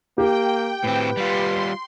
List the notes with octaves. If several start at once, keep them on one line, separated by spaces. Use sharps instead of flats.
A#3 G4 G5
A2 C4 B4
G3 F4 C6